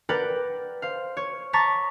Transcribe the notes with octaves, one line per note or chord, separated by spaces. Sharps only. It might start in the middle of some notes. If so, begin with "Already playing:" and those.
A#4 B4 D5 F#5 G5
C5 F5
C#5
A5 A#5 C#6 D6 A6 B6